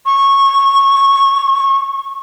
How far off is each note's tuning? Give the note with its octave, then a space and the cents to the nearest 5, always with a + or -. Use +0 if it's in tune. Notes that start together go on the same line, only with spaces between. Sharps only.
C#6 -15